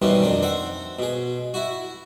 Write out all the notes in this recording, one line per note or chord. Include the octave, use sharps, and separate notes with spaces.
B2 D#3 E3 G3 C4 C#4
F2 D#3 C4 D4
C4 E5 F#5
B2 G#4
E4 F#4